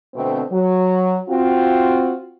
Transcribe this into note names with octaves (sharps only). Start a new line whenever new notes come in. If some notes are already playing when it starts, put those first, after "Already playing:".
B2 D3 A3 C4
F#3
C4 F4 F#4